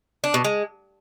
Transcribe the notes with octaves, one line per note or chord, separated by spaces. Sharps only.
D4
B2
G#3